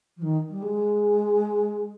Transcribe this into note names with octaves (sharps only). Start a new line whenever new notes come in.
F3
D#3
G3
G#3